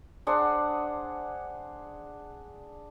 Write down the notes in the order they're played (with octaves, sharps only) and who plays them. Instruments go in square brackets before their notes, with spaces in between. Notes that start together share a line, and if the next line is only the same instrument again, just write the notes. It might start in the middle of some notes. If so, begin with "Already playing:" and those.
[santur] D4 G#4 C5 F#5